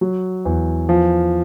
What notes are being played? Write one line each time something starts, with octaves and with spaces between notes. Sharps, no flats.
F#3
E2
F3